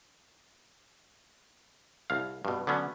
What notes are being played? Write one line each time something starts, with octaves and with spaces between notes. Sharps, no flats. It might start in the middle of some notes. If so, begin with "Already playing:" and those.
C2 F5
G2 B2
D3 F#3 B3 C#4